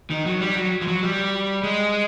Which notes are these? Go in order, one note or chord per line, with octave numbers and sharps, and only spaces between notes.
D#3
F#3
G3
F#3
F3
F#3
G3
G#3